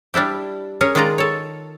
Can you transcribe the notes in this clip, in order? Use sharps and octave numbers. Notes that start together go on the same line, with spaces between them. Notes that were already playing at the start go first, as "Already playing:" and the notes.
G3 D4 E4 G4
C#4 G#4 A#4 C#5
D#3 G#3 F4 D5 D#5 A#5
A4 C#5